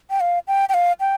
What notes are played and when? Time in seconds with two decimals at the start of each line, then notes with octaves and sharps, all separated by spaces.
0.10 G5
0.20 F5
0.48 G5
0.69 G5
0.74 F5
1.00 G5